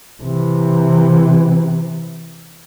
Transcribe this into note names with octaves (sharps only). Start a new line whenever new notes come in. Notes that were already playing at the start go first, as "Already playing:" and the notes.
C3 E3